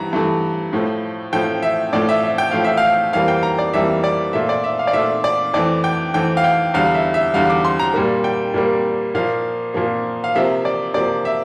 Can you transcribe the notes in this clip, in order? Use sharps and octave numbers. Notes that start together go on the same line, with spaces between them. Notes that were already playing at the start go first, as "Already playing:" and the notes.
Already playing: G2 E3 A#5
G2 E3 A3
A2 F3 A3
A2 F3 A3 G5
E5
A2 F3 A3 D5
E5
E5
G5
A2 F3 A3 F5
E5
F5
F2 E3 G3 A#3 F5
G5
A#5
D5
F2 E3 G3 A#3 E5
D5
A#2 A3 E5
D5
E5
F5
D5
A#2 A3 E5
D5
F2 E3 A3 D5
G5
F2 E3 A3 G5
F5
G5
E2 D3 G3 F5
E5
E5
E2 D3 G3 F5
D6
C6
A#5
A#2 G3 A#3
G5
A#2 G3 A#3
A#2 F3 A#3 F5
A#2 F3 A#3
F5
C3 F3 A#3 E5
D5
C3 F3 A#3 D5
E5